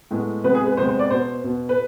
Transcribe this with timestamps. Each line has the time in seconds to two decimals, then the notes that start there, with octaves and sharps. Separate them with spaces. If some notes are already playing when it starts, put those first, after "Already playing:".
0.11 A2 G#3 B3
0.44 C3 G#3 B3 B4
0.55 G#4
0.66 B4
0.77 C3 G#3 B3 C5
0.89 C5
0.99 D5
1.10 B2 B3 C5
1.44 B2 B3
1.69 B4